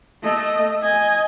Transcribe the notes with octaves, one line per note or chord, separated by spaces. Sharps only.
A3 D#5
D#5 G#5